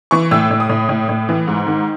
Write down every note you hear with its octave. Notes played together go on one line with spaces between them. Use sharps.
E3 C#6
A2 E6
A2
D#6
A2
A2
A2
E3
G#2
D#3